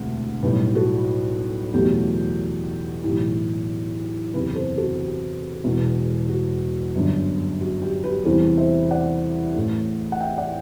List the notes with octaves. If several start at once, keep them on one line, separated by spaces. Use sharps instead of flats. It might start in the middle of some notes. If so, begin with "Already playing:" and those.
Already playing: E1 D2 C3
B1 A2 G3 G4 B4
F#4 A4
E2 B2 F#3 A3 G4
B1 A2 E3 G4
F#1 E2 C3 G4 B4
A4 C5
F#4 A4
G4
E1 E2 B2
F#4
G1 F#2 D3
F#4
G4
G4 B4
E2 C3 E3 G3 A4 C5
C5 E5
D5 F#5
A1 A2 E3 A3
F#5
E5 G5
D5 F#5